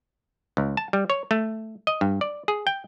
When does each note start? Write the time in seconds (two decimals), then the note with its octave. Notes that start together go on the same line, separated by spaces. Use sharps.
0.57 C#2
0.77 A5
0.93 G3
1.10 C#5
1.31 A3
1.87 D#5
2.01 G2
2.21 D5
2.48 G#4
2.67 G5